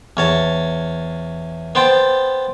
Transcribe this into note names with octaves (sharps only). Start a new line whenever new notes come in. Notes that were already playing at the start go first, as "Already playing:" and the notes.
E2 C#5 A5
B3 C5 G5 A5